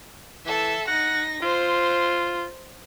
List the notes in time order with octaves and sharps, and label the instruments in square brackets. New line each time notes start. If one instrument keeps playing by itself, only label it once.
[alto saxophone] E3 [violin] A4 E5
[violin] D#4 A#6 [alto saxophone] F#5
[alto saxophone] F4 [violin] C5